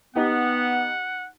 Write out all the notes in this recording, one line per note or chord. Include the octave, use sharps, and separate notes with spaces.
B3 D#4 G4 F#5